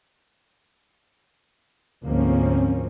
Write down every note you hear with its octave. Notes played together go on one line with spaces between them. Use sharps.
D2 G#2 F3 A#3 C4 C#4